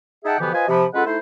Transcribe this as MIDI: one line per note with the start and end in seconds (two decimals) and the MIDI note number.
0.25 0.38 63
0.25 0.38 68
0.25 0.38 76
0.25 0.38 78
0.25 0.38 79
0.25 0.38 81
0.39 0.53 47
0.39 0.53 50
0.39 0.53 52
0.39 0.53 53
0.39 0.53 59
0.39 0.53 67
0.54 0.66 65
0.54 0.66 71
0.54 0.66 72
0.54 0.66 75
0.54 0.66 80
0.68 0.85 48
0.68 0.85 53
0.68 0.85 83
0.94 1.04 56
0.94 1.04 61
0.94 1.04 65
0.94 1.04 69
0.94 1.04 71
0.94 1.04 78
1.06 1.18 57
1.06 1.18 63
1.06 1.18 64
1.06 1.18 72